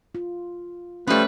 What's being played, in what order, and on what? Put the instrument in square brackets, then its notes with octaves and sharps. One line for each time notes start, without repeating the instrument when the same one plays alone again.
[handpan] F4
[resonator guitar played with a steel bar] F3 G3 [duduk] A3 [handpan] C#4 [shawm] B4